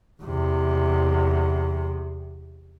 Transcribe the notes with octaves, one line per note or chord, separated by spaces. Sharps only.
E2 C3